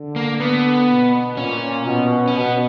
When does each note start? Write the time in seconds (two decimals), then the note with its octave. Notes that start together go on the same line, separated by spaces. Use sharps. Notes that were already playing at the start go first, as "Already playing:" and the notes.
Already playing: D3
0.16 A#3
0.40 B3
0.89 B2
1.37 A#2 C#4
1.86 B2
2.28 C#4
2.36 B2 B3